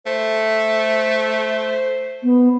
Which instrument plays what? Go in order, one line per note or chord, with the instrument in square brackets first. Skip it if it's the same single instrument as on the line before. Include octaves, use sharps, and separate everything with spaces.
[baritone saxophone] A3 [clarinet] C5
[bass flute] B3